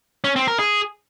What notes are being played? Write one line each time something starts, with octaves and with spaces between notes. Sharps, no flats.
C#4
C4
A#4
G#4